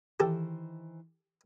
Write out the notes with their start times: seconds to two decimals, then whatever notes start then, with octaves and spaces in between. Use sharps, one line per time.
0.20 D#3 E3 G4 A4 C5